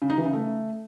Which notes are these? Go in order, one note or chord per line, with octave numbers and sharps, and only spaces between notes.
C#3
D#4
E3
C#3
A3